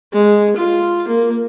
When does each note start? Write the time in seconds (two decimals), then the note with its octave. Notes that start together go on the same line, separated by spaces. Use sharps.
0.13 G#3
0.56 F4
1.08 A#3